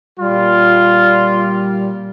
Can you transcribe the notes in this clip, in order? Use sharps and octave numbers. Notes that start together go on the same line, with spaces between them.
A#2 G3 F4